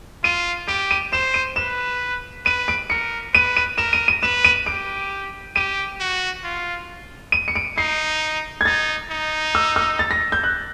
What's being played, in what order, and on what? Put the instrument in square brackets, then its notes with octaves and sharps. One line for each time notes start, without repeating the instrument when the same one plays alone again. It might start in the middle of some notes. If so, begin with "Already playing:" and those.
[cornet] F4 [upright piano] D#7
[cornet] G4 [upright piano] D7
[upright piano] D#7
[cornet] C5 [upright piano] E7
[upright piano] D#7
[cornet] B4 [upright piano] E7
[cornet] B4 [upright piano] D#7
[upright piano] D7
[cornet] A#4 [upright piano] C#7
[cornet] B4 [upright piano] D#7
[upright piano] D#7
[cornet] A#4 [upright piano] E7
[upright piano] D#7
D#7
[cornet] B4 [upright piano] E7
[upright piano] D#7
[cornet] G4 [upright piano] D7
[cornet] G4 [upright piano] D#7
[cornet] F#4
F4
[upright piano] D#7
C#7
D7
[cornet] D#4 [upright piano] C7
[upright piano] G#6
[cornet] D#4 [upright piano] A6
[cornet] D#4
[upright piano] E6
E6
A6
A#6
G6
F#6